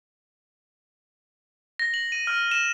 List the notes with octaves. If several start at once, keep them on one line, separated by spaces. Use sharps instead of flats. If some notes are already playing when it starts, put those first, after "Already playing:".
A#6
F#7
D#7
F6
E7